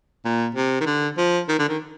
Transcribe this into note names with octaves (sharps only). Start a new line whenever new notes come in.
A#2
C3
D#3
D3
F3
D#3
D3
D#3